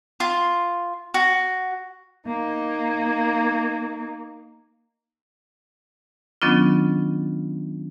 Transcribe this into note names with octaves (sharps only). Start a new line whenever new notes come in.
F4
F#4
A#3 D#4
D#3 F#3 B3 C#4 D4 F4